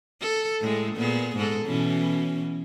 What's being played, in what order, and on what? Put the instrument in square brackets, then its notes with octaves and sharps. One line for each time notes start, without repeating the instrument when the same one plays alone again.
[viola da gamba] A4
A2 G#3
A#2 B3 G#4
G#2 G#3 A4
B2 E3 C#4